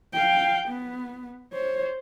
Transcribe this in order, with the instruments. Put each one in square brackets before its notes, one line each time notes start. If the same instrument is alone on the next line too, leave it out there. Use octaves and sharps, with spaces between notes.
[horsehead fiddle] F5 G5
B3
C5 C#5